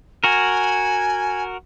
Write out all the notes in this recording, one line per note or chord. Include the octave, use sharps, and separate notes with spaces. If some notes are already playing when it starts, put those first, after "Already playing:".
F#4 A#4 G#5